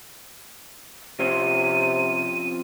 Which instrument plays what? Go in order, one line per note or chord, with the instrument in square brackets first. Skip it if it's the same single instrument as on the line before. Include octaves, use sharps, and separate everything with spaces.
[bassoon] C3 [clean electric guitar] F3 C4 C#4 [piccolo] D#7